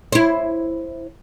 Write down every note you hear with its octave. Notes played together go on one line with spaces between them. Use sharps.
E4 C5